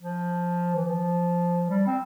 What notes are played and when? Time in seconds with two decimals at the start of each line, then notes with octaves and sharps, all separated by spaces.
0.01 F3
0.76 E3
0.85 F3
1.70 G3
1.87 C4